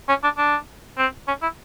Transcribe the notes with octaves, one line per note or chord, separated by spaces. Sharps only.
C#4
D4
D4
C4
C#4
E4